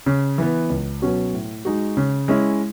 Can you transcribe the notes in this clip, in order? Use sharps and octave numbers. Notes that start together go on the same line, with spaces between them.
C#3
E3 B3
C#2
B2 F#3 C#4 F#4
A2
G#3 D#4 F#4
C#3
G#3 C#4 E4